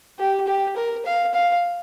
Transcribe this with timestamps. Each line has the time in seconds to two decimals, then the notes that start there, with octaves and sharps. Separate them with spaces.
0.19 G4
0.47 G4
0.76 A#4
1.06 F5
1.34 F5